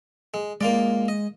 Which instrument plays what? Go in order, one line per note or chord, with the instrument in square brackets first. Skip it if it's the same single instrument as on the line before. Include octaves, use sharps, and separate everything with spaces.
[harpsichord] G#3
[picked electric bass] G#3 [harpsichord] A#3 F4 D5
[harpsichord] D#5